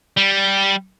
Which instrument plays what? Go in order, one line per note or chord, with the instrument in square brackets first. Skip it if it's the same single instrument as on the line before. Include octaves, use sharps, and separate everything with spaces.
[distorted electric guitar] G3